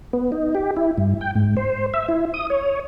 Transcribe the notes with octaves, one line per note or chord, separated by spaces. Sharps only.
B3
D#4
G4
E4
G2
G5
G#2
C5
E5
E4
D#6
C#5